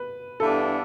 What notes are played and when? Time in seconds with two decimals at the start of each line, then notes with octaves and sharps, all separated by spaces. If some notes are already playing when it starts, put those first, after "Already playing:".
Already playing: B4
0.40 G2 E3 B3 D4 A4